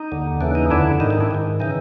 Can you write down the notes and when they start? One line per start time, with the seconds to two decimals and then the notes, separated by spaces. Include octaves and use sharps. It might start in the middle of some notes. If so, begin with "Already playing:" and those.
Already playing: D#4
0.12 D#2 D3
0.41 D#2 C#3 E3 D4
0.55 D#4
0.70 F2 D3 D4 E4
1.00 G#2 D#3 D#4
1.10 D#4
1.20 D4 E4
1.31 G#2 D#3
1.60 C#3 E3 D#4